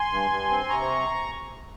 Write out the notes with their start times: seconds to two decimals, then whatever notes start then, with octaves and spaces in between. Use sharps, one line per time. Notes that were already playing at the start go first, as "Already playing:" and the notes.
Already playing: G#5 C6
0.11 G2
0.31 G2
0.50 C4
0.69 C3 A#5 C#6